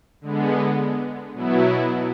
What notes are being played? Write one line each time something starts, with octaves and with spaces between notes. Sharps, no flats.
D3 G#3 B3
B2 F#3 B3 E4